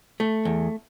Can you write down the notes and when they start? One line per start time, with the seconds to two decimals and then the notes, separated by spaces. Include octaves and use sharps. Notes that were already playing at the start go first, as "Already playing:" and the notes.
0.20 A3
0.45 E2